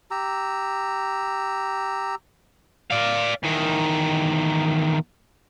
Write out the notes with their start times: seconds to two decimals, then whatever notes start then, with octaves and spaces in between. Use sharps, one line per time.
0.11 G4 A#5 E6
2.91 D5 F5
3.43 E2 D#3